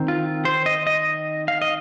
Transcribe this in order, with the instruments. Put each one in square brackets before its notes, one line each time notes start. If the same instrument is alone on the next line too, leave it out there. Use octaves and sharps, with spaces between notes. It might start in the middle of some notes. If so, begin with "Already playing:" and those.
Already playing: [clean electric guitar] D#3 C4
F4
C5
D#5
D#5
F5
D#5